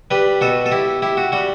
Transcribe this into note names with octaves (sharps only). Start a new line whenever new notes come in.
G3 G4 B4
B2 F#4 A4
A4
E4 G4
E4 G4
F#4
G3 F#4